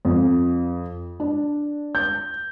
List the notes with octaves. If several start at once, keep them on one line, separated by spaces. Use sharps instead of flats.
F2
D4
G6